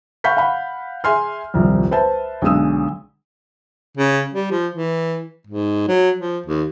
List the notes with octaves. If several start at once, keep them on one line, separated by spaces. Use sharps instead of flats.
F5 F#5 B5 C#6 G6 B6
F5 F#5 B5
G#4 E5 G#5 C6 F6
D#1 C2 F2
B4 C5 E5 A5
B1 D3 G#3 D#6 E6
C#3
G3
F3
E3
G#2
F#3
F3
D#2